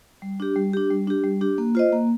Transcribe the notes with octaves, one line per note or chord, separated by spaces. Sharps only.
G3
D4 G4
G3
D4 G4
G3
D4 G4
G3
D4 G4
A#3
F4 C5 D#5
A#3